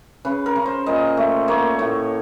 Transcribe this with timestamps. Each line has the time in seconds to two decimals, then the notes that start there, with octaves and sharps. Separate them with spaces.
0.25 C#3 B4
0.46 A#4
0.56 C#3
0.66 C5
0.86 A#2 D#5
1.17 A3
1.48 A#3 C#5
1.79 A2